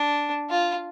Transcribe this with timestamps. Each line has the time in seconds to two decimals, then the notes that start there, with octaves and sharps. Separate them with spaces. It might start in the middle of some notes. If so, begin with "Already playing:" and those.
Already playing: D4
0.50 F4